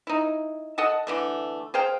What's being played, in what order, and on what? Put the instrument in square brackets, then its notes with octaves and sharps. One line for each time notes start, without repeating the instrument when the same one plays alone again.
[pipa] D#4 E4
A4 D#5 F#5 A5
D3 E3 A3
G#4 C5 F5 G5